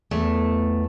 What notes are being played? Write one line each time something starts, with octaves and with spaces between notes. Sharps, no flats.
E2 A3